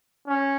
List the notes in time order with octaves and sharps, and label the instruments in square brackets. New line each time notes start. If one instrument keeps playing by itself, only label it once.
[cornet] C#4